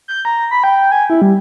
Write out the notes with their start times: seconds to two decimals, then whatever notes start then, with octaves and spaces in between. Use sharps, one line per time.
0.08 G6
0.25 A#5
0.51 B5
0.64 G5
0.92 G#5
1.10 E4
1.22 G3